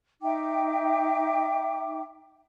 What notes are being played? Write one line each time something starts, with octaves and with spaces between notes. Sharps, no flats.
D#4 E5 G5 D6